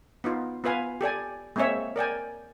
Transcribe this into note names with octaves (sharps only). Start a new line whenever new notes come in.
B3 D#4 F4
B3 F4 B4 F5 G#5
G4 A4 D5 G#5
G#3 A#3 C4 G#4 C#5 E5
A#4 D5 G5 G#5